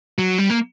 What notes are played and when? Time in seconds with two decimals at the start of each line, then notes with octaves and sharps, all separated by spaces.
0.18 F#3
0.38 G3
0.50 A#3